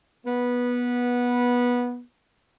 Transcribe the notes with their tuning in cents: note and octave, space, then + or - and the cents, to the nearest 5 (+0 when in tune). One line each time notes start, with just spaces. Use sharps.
B3 -15